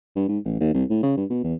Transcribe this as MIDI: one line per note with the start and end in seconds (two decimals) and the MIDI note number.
0.16 0.24 43
0.28 0.38 44
0.45 0.58 33
0.60 0.74 39
0.74 0.84 36
0.90 1.01 45
1.03 1.15 49
1.17 1.25 43
1.30 1.40 47
1.43 1.55 40